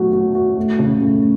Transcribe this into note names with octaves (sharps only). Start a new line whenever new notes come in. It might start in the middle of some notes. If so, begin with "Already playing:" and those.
Already playing: B2 F#3 A3 F#4
F#4
F#4
A3
C#3
A3